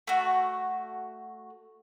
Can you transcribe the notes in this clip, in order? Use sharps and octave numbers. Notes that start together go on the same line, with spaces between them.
A3 F#4